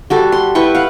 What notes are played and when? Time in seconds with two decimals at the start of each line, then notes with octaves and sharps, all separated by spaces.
0.10 G3 F#4 A4
0.32 C6
0.55 E4 B4 G5 C#6
0.75 F5 F#5